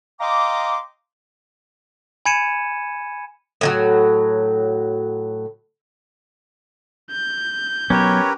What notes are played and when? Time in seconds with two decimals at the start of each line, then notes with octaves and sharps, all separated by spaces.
0.20 D#5 F5 G5 A#5 C6 D6
2.25 G#5 B5 G#6 C#7 D#7 E7
3.61 A2 E3 F#3
7.11 G6
7.90 F#3 B3 C#4 G4 A#4 B4 C#5